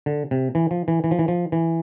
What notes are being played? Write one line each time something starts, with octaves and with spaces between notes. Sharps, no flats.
D3
C3
E3
F3
E3
E3
F3
E3
F3
E3